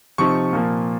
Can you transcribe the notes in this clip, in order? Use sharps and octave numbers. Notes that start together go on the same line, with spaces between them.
C3 F3 C4 D#4 C#6
A#2 F3 A#3